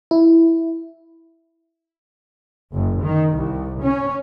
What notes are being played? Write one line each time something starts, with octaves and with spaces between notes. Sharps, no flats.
E4
F#1
D#3
C2
C#4